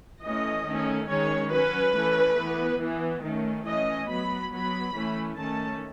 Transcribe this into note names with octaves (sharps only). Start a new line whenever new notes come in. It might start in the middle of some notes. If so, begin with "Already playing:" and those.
E3 A3 C#4 D#5
D#3 A3 C#4
D#3 G#3 C#4 C#5
F#3 C#4 B4
E3 A3 C#4
E3 B3
E3 B3
D#3 A3 C#4
E3 A3 C#4 D#5
F#3 B3 B5
F#3 B3 B5
E3 A3 C#4
D#3 A3 C#4 A5